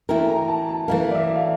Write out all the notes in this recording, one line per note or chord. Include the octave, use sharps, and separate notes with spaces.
E3 A3 E4 A#4 G5
A#5
A5
A5
E3 A3 E4 A#4 F5
D5
E5
F5